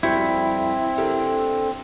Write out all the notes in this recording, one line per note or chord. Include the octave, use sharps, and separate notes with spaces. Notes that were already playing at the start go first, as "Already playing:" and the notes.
F2 G3 C4 E4 F#4
D3 A#3 G4